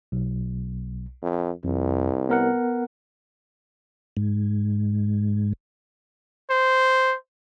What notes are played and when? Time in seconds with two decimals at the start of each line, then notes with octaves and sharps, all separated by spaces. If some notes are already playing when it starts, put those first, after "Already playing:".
0.12 B1
1.22 F2
1.64 C2 F2
2.30 B3 A#4 F#5
4.17 G#2
6.50 C5